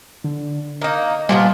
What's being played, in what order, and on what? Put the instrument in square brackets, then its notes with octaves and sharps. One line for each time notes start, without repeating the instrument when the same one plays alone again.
[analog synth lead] D3
[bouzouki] A#3 D#4 [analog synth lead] D#5
[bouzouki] A#2 F3 B3 [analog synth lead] G3